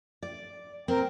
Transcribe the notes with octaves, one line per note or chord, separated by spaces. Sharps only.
D5
C4 A#4